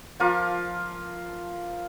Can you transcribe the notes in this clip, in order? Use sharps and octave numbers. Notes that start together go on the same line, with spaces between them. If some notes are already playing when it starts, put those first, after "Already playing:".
F3 F4 A#4 D6